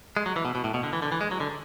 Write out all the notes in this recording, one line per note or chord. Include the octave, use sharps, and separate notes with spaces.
G#3
F#3
E3
B2
B2
A2
B2
D3
E3
D3
E3
G#3
F#3
D3